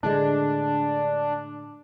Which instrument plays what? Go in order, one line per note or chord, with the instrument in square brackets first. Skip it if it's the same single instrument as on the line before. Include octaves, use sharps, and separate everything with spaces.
[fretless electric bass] A2 D3 G#3 [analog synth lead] D4